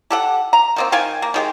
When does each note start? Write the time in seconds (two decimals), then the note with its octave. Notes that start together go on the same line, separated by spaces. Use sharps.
0.10 G4 A4 F#5
0.53 A#5
0.76 D#3 A#3 C4
0.92 D#3 F5 G5 G#5
1.22 A#3
1.34 D#3 G#3 G4